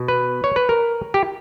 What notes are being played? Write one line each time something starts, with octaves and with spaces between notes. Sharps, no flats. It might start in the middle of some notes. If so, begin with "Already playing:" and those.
Already playing: B2
B4
C#5
B4
A#4
G4